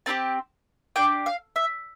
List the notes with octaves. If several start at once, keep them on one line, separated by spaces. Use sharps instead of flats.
C4 E4 G4 A5
D4 G4 G5
F5
E5